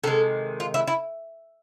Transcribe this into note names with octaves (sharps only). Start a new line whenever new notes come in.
C3 D#3 G#3 A4
F4
E4
E4